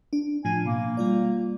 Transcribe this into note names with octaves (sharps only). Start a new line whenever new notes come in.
D4
A2 F3 D4 G#5
B2 A#3
G3 F4 D5